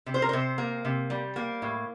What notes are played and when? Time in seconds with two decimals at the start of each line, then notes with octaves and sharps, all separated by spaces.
0.06 C3
0.14 C5
0.22 A#4
0.29 C3 C5
0.58 A#3
0.85 C3
1.10 G3
1.36 A#3
1.62 A2